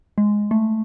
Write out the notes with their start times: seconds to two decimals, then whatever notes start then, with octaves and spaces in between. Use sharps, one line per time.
0.18 G#3
0.51 A3